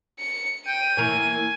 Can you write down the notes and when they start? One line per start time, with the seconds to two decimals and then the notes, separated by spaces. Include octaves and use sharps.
0.19 C#7
0.66 G5 D#7
0.97 E3 A#3 C#5 G#5